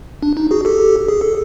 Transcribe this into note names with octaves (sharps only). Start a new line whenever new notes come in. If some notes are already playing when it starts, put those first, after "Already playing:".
D4
D#4
F#4 G#4
G4 A4
G#4
A4